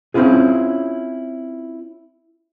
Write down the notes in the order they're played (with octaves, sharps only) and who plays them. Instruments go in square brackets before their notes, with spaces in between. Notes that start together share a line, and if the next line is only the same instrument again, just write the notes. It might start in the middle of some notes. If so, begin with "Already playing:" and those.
[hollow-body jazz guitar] C4 C#4 E4 F4 G#4